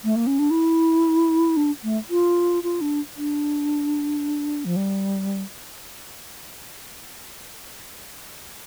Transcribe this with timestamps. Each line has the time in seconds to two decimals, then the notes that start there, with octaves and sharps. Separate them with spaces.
0.04 A3
0.16 A#3
0.27 C#4
0.39 D4
0.51 E4
1.57 D4
1.84 A3
2.10 F4
2.63 F4
2.81 D4
3.17 D4
4.65 F3
4.76 G3